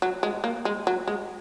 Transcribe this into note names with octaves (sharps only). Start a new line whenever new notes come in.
F#3
G#3
A#3
G#3
F#3
G#3